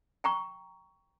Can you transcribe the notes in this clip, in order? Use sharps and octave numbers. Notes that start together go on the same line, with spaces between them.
G5 A#5 C#6